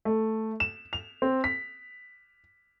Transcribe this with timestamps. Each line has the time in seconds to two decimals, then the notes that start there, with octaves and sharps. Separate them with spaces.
0.05 A3
0.60 E7
0.93 F7
1.22 C4
1.44 B6